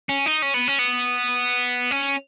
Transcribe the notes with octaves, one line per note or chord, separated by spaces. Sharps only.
C#4
D#4
C#4
B3
C#4
B3
C#4